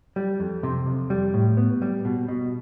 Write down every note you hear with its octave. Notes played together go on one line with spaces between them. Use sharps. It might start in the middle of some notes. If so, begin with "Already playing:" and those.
G3
F2
C3
F2
G3
A2
B3
G3
B2
B2